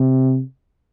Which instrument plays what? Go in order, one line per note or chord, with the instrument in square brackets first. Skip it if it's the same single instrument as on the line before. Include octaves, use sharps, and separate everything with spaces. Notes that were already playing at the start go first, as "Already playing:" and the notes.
Already playing: [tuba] C3